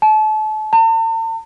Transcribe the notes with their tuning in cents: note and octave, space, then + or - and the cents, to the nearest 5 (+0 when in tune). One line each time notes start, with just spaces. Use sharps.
A5 -35
A5 +45